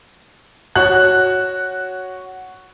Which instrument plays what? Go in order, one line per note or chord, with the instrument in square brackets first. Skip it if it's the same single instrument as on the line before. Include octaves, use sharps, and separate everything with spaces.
[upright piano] F#4 C#5 [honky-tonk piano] F#6